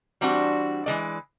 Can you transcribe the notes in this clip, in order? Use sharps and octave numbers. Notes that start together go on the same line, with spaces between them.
E3 G3 C4 D4 F#4
E3 G#3 D5